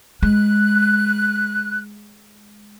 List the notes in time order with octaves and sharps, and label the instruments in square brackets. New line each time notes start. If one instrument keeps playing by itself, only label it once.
[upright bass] G#3 [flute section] F#6